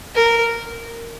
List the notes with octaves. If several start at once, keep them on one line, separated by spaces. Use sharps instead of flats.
A#4